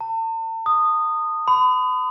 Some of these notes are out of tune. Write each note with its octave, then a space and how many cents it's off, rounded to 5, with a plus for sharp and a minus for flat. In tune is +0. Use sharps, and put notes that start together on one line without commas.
A5 +40
D#6 -15
B5 +40